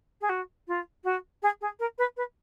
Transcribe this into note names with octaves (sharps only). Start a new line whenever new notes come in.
G#4
F#4
F4
F#4
G#4
G#4
A#4
B4
B4